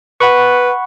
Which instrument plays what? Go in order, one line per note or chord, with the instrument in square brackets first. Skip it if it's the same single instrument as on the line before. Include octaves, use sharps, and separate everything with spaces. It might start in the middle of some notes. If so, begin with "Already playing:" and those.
[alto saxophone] B4 [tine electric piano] F#5 B5 C#6